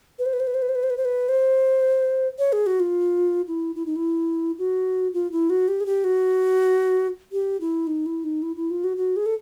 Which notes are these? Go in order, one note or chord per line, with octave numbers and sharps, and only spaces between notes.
B4
C5
B4
C5
B4
C5
B4
C5
B4
C5
B4
C5
B4
C5
C#5
G#4
F#4
F4
E4
E4
D#4
E4
F#4
F4
E4
F#4
G4
G#4
G4
F#4
G4
E4
D#4
E4
D#4
E4
E4
F4
F#4
F#4
G#4
A4